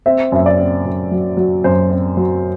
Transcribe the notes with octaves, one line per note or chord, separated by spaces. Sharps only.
C4 E5
F#2 E5
D5
C4
F#2
F#3
F#3
F#2 C5
C4
F#3